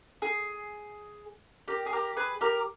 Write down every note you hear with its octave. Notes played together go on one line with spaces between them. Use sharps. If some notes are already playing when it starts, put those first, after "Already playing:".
G#4
G4 A#4
G#4
G4 A#4
G#4 B4
G4 A#4